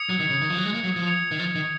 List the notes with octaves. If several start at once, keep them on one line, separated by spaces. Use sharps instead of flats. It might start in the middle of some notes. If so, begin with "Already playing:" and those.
Already playing: D#6 G#6 C#7
F#3
D#3
C#3
D#3
F3
F#3
G#3
A#3
F#3
F3
G#6 C#7 F7
D#3
F3
D#3